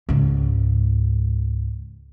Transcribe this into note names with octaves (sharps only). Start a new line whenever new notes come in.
C#2 G#2